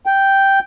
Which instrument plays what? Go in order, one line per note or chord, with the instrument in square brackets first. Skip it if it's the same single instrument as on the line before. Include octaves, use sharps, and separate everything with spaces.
[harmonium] G5